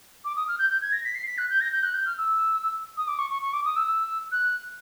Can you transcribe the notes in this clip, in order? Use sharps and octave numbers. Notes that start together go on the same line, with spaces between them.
D6
D#6
F6
G6
G6
G#6
A#6
B6
C7
B6
F#6
G6
A#6
G6
F#6
G6
F6
E6
D#6
D6
C#6
C#6
C#6
D6
D#6
E6
E6
F#6